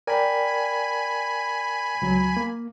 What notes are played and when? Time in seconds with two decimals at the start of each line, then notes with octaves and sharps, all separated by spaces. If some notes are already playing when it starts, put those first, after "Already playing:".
0.07 A#4 D5 G5 G#5 B5
2.02 C#2 F#3
2.37 A#3